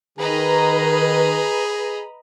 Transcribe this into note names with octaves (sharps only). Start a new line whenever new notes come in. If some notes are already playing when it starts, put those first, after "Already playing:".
D#3 G#4 B4 D#5 A#5 B5